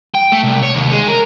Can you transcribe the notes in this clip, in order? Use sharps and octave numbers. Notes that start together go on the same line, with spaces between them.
G5
A3
C2
C#5
D#2
G#3
A#4